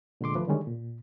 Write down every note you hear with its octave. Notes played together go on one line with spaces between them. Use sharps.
A#2 D3 G#3 C6 D6
D2 F3 A3 B4
D3 D#3 G3 G#3 C#4
A#2